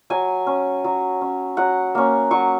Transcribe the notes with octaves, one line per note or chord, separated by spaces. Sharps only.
F#3 G#5
C#4
F#3
C#4
F#3 F#5
A#3 C#4
F#3 C#6